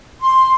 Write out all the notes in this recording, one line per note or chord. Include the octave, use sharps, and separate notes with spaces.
C6